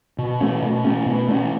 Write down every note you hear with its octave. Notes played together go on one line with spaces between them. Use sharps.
B2
A3 C#4
B2
A3 C#4
B2
A3 C#4